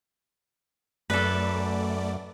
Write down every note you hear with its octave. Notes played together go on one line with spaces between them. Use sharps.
F#2 A3 A4 B4 D5